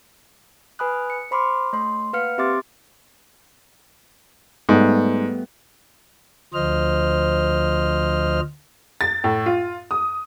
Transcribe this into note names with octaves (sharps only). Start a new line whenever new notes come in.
B4 G#5 B5 D#6 F#6
C#7
C5 B5 C6 D6 F6
A3 C#5 C6
A#3 B4 F5 F#5 F6 C#7
C4 G4 E5 C6 D6 A6
G#2 G3 A3 B3
D2 F3 C5 D#5 F6
A6
A2
F4
D#6